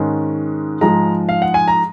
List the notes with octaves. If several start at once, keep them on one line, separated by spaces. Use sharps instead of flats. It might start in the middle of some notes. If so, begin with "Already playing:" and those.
Already playing: G#2 D#3 G#3 C#4
G#2 F3 G#3 A#5
F5
F#5
G#5
A#5